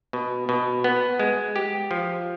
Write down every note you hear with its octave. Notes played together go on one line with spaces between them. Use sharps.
B2
B2
B3
G#3
G4
F3